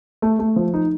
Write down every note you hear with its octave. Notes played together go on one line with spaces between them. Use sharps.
A3
A3
F3
D#4